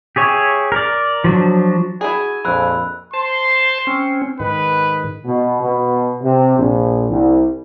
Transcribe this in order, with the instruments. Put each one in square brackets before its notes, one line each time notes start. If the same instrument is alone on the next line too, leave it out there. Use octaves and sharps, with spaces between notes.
[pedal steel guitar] G4 G#4 C#5 E5
A#4 D5
F3 F#3 D4
[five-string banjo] E4 F#4 G#4 [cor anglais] G#5
[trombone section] A#1 F2 [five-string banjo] A#3 [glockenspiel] B5 E6 F#6
[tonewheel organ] C5 A5 [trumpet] C6
[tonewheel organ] C4 C#4
[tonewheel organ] G#2 D#3 [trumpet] B4
[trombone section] B2
B2
C3
A#1
C2